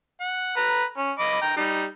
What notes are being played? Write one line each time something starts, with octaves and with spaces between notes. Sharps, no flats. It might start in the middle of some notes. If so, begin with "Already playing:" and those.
F#5
B4 A#5
C#4
D#5 B5 D6
G5 A#5
G3 D#4